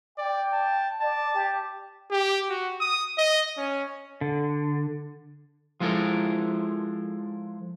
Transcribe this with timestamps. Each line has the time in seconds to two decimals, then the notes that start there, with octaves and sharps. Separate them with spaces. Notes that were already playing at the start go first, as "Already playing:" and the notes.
0.18 D5 G5
0.53 A5
1.02 D5 A5
1.34 G4
2.11 G4
2.49 F#4
2.80 D#6
3.18 D#5
3.57 C#4
4.21 D3
5.80 F3 G#3 E4 A4 A#4